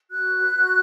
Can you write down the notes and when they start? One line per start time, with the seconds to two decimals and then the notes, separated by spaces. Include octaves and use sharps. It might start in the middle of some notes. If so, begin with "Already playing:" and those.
0.09 F#4 F#6
0.31 B4
0.52 F#4